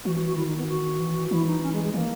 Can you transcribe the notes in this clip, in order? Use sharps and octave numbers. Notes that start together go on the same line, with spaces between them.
E3 F#4
F#4
F#4
D#3 E4
D#4
B3
F#4
E3
E3 E4
D#4
C#4
G#3
G#3
E3 A#3